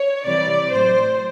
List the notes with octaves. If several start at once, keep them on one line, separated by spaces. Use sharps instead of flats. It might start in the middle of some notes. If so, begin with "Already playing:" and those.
Already playing: C#5
C3 E3 G3 D5
A2 F#3 C5